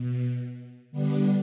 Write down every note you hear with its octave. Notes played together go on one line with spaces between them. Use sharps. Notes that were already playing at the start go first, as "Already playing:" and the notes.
Already playing: B2
D3 G3 B3 D4